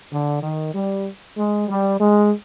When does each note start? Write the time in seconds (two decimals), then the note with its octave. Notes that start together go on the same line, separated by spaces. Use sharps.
0.12 D3
0.43 D#3
0.74 G3
1.37 G#3
1.68 G3
1.99 G#3